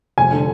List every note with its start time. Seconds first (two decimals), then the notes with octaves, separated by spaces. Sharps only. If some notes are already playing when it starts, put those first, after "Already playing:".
0.18 F1 G#5
0.32 D3